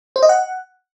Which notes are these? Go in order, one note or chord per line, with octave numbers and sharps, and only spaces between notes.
C5
D#5
F#5